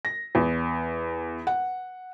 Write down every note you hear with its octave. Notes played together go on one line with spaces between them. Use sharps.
A#6
E2
F#5